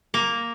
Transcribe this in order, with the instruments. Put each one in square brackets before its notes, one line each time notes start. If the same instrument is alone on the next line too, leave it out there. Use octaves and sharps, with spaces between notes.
[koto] A#3